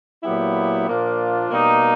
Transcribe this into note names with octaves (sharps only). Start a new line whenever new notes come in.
A#2 F#3 B3 E4 G4
A#2 F3 A#3 D4 F4
B2 G3 A#3 D#4